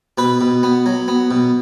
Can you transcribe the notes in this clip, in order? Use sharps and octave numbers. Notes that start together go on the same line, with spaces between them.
B2 B4
B2
B3
F#3
B3
B2